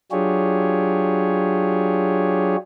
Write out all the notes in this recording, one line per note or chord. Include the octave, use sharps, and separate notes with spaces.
F#3 D4 F4 G4 G#4 C#5